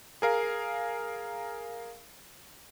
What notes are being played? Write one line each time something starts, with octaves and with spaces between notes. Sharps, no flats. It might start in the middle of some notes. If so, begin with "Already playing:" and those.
G#4 A#4 F5